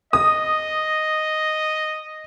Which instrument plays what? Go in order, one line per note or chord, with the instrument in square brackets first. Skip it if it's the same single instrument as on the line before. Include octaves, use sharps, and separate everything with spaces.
[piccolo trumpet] D#5 [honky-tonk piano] D#6